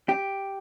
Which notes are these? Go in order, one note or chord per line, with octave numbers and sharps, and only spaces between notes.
G4